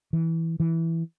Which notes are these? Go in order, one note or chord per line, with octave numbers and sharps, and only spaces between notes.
E3
E3